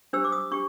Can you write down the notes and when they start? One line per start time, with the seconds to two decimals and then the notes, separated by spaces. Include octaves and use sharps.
0.13 D4 G4 C5 E6
0.24 D6
0.32 D#6
0.51 D4 G4 C#6